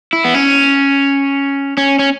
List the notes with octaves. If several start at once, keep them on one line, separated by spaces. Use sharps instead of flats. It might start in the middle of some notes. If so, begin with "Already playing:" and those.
E4
B3
C#4
C#4
C#4